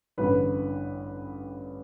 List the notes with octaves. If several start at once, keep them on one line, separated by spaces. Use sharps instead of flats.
A1 G2 D3 B4